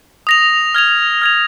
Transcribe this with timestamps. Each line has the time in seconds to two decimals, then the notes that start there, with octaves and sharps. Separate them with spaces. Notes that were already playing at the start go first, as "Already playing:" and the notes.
0.27 D#6 A#6 F7
0.75 F6 G#6 F7
1.22 F6 G#6 F7